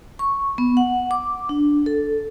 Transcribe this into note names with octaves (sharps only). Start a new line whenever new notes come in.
C#6
B3
F#5
D6
D4
A4